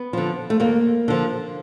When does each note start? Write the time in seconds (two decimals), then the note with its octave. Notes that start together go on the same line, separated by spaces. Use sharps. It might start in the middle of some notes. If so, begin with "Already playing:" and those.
Already playing: B3
0.13 D3 F3
0.50 A3
0.60 D#2 A#3
1.08 D3 F3